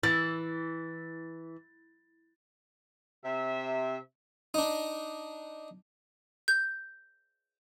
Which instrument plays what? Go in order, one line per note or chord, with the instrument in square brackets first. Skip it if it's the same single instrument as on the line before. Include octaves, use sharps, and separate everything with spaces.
[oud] E3 [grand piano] A6
[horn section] C3 E5
[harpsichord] D4 D#4
[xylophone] G6